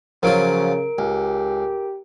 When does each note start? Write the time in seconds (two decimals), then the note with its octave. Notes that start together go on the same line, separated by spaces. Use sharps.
0.23 C#3 F3 F#3 F4 A#4 D7
0.98 C#2 G4